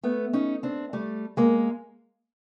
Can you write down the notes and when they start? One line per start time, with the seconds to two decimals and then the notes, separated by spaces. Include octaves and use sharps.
0.03 A3 B3
0.33 C#4 D#4
0.63 C4 D4
0.93 G3 A3
1.37 G#3 A#3